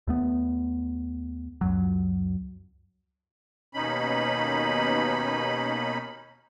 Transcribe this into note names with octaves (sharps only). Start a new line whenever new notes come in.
D#2 A3 B3
C#2 F#2 F#3
D#2 B2 C#4 D#4 B5